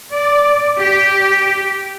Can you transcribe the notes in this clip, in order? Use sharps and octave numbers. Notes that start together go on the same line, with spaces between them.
D5
G4